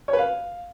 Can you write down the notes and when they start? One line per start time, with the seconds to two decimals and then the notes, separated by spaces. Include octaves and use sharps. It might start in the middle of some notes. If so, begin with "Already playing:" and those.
0.08 C#5
0.13 B4
0.18 F5